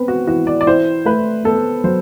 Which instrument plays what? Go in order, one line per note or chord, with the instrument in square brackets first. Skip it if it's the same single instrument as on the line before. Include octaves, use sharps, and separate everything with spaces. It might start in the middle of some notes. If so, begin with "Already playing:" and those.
Already playing: [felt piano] B3 C4 [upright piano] B4
[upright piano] F#4
[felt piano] E3 [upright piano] F#4
[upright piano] D5
D5
[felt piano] E4 [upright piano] C5
[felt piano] A3 [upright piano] B4
[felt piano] B3 [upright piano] A4
[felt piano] F#3 [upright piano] C5